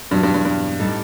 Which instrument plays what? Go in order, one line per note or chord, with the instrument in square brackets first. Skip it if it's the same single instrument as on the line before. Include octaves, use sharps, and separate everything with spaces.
[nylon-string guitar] E2 B2 F#3 C4 E4 [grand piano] G2
[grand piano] G2
G2
G2
[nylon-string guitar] A2 G3 C4 D#4 A4